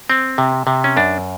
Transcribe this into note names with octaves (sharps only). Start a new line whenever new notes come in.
C4
C3
C3
C#4
F#2 D4